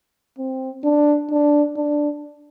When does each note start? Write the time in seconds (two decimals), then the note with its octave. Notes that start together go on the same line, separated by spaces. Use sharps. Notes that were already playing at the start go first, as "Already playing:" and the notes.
0.38 C4
0.84 D4
1.31 D4
1.77 D4